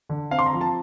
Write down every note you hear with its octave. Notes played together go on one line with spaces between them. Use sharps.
D3
C4 F5
C6
A#5
F3
A5